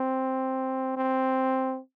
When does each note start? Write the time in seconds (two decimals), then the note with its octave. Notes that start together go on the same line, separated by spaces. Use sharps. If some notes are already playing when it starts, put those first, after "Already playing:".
Already playing: C4
0.97 C4